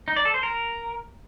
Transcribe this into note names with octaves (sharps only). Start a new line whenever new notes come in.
D#4
D5
A4
C5
A#4